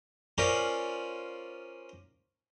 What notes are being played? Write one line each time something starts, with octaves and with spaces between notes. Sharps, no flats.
C#4 F4 A#4 C5 D5